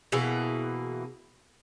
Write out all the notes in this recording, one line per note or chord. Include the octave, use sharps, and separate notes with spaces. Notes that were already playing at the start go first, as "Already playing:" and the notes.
B2 E3 A#3 G#4